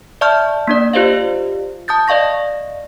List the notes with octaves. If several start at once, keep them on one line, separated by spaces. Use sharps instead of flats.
D5 E5 A5 C#6 F6 G6
A#3 D4 D5
F4 G4 C5 D5 D#5 F5
A5 D#6 G6 A6
D5 D#5 F5 C#6 A#6